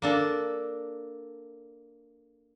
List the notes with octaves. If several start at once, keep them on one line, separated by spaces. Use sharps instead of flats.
A#3 D4 A4